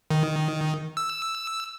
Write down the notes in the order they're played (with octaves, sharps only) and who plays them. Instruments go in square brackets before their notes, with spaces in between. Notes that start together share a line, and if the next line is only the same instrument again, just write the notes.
[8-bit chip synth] D#3
E6